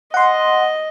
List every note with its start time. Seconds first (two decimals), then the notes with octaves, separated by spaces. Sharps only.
0.14 D#5 F#5 C6